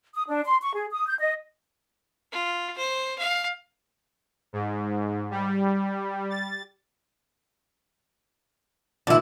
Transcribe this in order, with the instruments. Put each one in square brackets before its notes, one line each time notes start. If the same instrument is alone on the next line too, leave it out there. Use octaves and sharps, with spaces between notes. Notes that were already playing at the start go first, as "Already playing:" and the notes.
[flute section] D#6
D4
C6
C#6
G#4
D#6
G6
D#5
[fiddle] F4
C5
F5
[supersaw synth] G#2
G3
A6
[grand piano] G#1 A#2 D6 [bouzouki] D4 E4